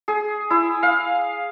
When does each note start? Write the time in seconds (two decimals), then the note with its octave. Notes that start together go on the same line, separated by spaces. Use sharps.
0.08 G#4
0.50 E4
0.83 F5